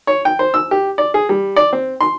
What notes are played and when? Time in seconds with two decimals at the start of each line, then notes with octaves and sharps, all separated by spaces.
0.07 C#5
0.25 G5
0.39 C5
0.54 E6
0.71 G4
0.98 D5
1.14 G#4
1.29 G3
1.56 D5
1.73 C4
2.01 C6